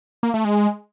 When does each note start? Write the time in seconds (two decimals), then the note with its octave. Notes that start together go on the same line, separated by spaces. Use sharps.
0.23 A#3
0.34 A3
0.45 G#3